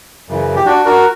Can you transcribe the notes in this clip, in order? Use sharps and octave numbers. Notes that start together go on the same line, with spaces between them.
F#2 C#3 E3
G4
D4 F#4
F#4 A#4